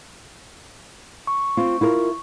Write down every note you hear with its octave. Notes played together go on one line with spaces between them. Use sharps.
C#6
C4 F4
E4 F4 A#4